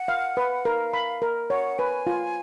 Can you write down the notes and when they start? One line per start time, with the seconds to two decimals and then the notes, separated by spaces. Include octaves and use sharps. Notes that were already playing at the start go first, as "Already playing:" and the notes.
Already playing: F#5
0.08 F5
0.37 B4
0.65 A#4 F5
0.93 B5
1.22 A#4
1.50 C#5 F#5
1.79 B4 G#5
2.07 F4